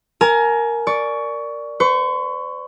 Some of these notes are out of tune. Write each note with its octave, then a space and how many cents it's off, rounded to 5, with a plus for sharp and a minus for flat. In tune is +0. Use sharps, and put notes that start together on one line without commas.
A#4 +0 G#5 +30
D5 +0 C#6 +20
C5 -45 C#6 +0